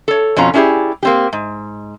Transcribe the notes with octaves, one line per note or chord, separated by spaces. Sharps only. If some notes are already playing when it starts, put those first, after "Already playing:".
A4 C#5
F2 B2 C#4 F4 A#5
C#4 D4 E4 G4 G#4 D5
A#3 C4 G4
G#2